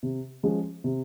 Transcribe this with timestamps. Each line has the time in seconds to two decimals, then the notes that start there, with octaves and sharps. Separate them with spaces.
0.03 C3
0.43 F3 G#3 C#4
0.84 C3